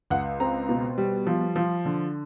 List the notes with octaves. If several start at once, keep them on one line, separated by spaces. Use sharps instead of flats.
C#2 F#5
C4 A#5
B2
G3
F3
F3
D3